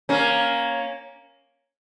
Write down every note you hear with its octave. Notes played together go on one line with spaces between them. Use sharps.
A#3 C#4